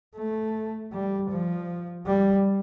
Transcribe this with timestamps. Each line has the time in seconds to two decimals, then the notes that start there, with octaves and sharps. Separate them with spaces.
0.16 A3
0.93 G3
1.31 F3
2.07 G3